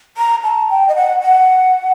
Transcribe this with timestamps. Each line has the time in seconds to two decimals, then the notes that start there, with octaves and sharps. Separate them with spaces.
0.17 A#5
0.43 A5
0.70 G5
0.88 D#5
0.96 F#5
1.22 F#5